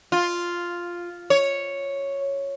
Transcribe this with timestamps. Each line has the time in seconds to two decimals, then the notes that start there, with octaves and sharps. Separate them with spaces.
0.12 F4
1.30 C#5